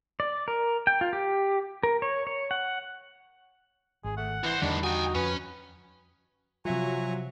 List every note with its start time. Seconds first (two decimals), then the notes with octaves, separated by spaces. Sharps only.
0.20 D5
0.48 A#4
0.87 G5
1.01 F4
1.13 G4
1.83 A#4
2.02 C#5
2.27 C#5
2.51 F#5
4.04 G#1 G#4
4.17 A3 F#5
4.44 C2 E3 C5
4.62 E2 A2 D3 D#3 G3 D4
4.83 D#4 F#4 G5 G#5
5.15 F2 C#4 B4
6.65 C3 F3 F#3 F4 E5 G#5 A#5 C#6